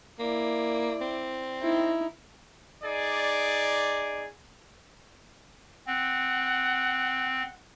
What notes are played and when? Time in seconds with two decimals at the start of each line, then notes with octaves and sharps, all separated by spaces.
0.19 A#3 E4 D5
1.01 C4
1.62 D#4 E4
2.83 D#4 G#4 D5
5.87 C4 F#5